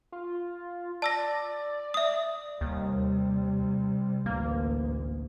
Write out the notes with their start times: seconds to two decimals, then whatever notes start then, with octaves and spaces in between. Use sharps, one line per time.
0.12 F4
1.02 D5 A5 E6 A#6
1.94 E5 D#6
2.61 D#2 C3 G3
4.26 A1 D2 A#3